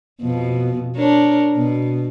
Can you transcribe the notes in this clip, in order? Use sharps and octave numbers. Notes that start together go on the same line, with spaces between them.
F2 B2
D4 A#4 C#5
B2